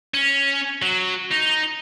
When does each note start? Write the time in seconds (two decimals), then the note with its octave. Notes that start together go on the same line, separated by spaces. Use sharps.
0.14 C#4
0.82 F#3
1.31 D#4